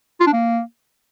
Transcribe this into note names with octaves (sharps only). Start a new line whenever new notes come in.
F4
D4
A#3